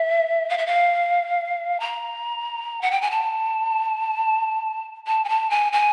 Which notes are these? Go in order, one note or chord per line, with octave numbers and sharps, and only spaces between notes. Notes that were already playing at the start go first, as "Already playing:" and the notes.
Already playing: E5
F5
E5
F5
A#5
F#5
G5
G#5
A5
A5
G#5
A5
G#5
G#5